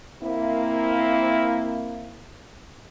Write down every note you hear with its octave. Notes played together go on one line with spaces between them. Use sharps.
A#3 C4 E4